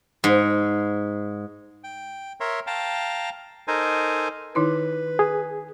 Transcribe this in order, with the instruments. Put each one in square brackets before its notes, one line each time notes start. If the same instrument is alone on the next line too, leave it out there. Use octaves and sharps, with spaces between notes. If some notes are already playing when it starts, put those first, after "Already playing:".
[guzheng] G#2
[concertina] G5
A#4 C#5 E5 C6
F5 G5 A5 A#5
D#4 A4 A#4 C5 G#5
[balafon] D#3 D#4 E4 [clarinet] B4
[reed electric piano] G#4